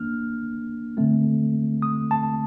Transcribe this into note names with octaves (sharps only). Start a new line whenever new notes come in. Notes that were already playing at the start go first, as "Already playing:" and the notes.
Already playing: D#3 A#3 D4 F6
D3 A3 C4
D#6
A5